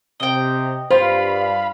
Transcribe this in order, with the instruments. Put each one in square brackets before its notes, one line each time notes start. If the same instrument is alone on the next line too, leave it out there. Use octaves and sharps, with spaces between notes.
[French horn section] C3 [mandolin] D#5 G5
[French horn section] G2 [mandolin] F4 [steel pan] C5 [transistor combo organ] F5 B5